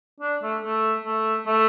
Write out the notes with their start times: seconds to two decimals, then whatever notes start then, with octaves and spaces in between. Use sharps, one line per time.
0.20 D4
0.42 A3
0.62 A3
1.04 A3
1.47 A3